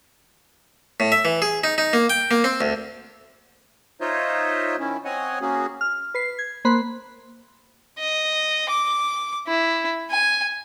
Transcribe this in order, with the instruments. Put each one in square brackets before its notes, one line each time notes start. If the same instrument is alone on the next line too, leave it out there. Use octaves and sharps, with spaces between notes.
[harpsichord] A2
E5
E3
G#4
D#4
D#4
A#3
G5
A#3
C4
D2
[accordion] D#4 F4 C5 C#5 D#5 E5
D#3 C#4 E4
C4 C#5 D#5 F#5 G#5
A#3 C#4 F#4 G#4
[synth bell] F6
B4 C7
G#6
A#3 C5 B5 C6 F#6
[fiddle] D#5
D6
E4
G#5